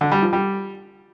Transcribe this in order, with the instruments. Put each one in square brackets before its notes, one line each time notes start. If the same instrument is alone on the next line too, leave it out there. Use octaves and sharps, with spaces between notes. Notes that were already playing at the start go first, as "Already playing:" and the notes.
[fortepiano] D3
G3
F3
G3